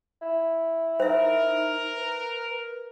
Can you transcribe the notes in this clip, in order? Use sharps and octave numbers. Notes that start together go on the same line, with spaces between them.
E4
D#4 A#4 C5 E5
B4